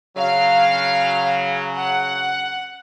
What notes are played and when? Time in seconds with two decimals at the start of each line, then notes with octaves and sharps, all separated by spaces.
0.17 C#3 F#3 F5
1.76 F#5